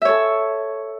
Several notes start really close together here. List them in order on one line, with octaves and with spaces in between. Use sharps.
E5 C#5 A4